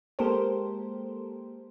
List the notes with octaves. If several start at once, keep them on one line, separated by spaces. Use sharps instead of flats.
G#3 A#3 G4 A4 A#4 C5